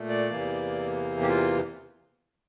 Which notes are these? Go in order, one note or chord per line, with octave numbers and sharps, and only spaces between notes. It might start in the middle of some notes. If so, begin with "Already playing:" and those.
Already playing: A#2 A3
D5
E2 C3 E3 A#3
G4
F4